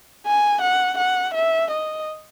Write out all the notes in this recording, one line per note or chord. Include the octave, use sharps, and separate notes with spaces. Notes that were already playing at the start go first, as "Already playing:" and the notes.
G#5
F#5
F#5
E5
D#5